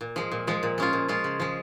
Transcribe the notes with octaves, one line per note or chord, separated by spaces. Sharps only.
A#2
F3 G#3
A#2
F3 G#3
A#2
G#3 C#4 F4
A#2
G#3 C#4 F4
C#3
F3 G#3